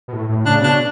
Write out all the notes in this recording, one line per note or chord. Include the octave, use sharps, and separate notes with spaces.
B2
A2
A2
C#3 D4
B2 D4